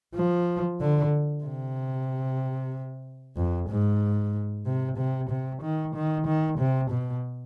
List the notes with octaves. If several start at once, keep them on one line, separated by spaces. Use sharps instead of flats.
F3
D3
C3
F2
G#2
C3
C3
C3
D#3
D#3
D#3
C3
B2